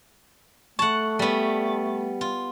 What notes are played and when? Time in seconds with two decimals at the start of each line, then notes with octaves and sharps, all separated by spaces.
0.79 A3 F#5 A5 C#6
1.19 G3 B3
2.21 F4